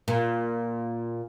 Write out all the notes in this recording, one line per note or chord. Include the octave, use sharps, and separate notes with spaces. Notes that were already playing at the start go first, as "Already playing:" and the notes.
A#2